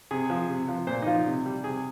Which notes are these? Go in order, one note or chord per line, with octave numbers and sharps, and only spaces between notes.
C3 G#4
F3
C3
F3
A#2 C5
D#4
F3 F4
C3
G3
C3 G#4